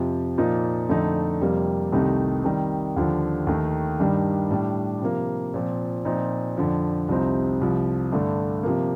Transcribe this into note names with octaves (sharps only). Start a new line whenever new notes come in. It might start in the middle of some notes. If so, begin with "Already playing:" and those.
Already playing: F2 C3 F3
A#2 F3 A#3 D#4
F2 D3 A3 D#4
F2 C3 G3 A#3
C2 C3 D#3 A3 D#4
C3 D#3 G3
D#2 D3 F3
D#2 D#3 A3
G2 D#3 G3 D4
A2 G3 D4
C3 F3 A#3
A#2 F3 C4
A#2 F3 C4 D#4
F2 D3 F3
C2 C3 F3 C4 D#4
C2 C3 F3
G2 D3 A3
C3 F3 A#3